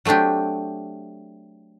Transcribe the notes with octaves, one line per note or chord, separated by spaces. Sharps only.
F#3 A3 C4 D4 G4